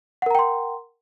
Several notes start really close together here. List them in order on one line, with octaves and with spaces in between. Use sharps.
F#5 A#4 A#5 G5 C6